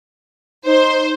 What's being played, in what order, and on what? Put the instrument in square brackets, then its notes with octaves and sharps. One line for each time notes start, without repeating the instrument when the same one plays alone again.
[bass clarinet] D#4 [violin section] C5